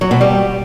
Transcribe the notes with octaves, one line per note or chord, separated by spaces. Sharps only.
F#3
B2
G3